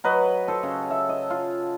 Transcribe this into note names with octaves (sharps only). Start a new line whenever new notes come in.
F#3 B4 D#5
A4 C5
C#3
E5
D#5
F4